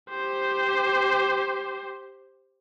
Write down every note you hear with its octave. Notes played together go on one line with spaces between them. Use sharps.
G4 C5